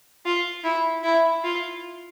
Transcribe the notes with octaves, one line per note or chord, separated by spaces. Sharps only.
F4
E4
E4
F4